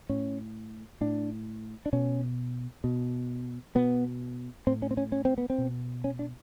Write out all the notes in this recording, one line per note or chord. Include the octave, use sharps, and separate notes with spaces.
A2 C#4
A2 D4
D4
B2 C#4
B2
B2 B3
A2 C4
C#4
C4
C#4
C#4
C4
B3
C4
B2
C#4
D4